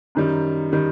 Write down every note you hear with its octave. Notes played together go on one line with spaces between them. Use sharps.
F#2 D#3 G3
D#3 G3